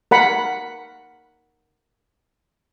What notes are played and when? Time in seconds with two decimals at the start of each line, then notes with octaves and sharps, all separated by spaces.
0.11 A#4 F#5 B5